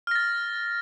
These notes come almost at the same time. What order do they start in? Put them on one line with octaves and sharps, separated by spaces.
F6 A#6 A6